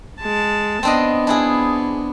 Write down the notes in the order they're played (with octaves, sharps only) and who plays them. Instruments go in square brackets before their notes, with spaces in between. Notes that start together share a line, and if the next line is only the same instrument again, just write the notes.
[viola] G#3 A5
[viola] B3 [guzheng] C4 D4 D#5
[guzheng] D4 E4 G#4